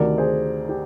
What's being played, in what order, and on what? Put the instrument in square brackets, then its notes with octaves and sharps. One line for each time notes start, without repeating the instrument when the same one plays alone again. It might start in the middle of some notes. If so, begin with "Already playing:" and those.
Already playing: [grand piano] D2 C3 D#3 A#4 D5
G#4 C5
G4